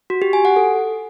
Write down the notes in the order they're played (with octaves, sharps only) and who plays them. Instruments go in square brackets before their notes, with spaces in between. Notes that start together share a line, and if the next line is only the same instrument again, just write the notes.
[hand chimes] F#4
G4
G#5
F#5
A4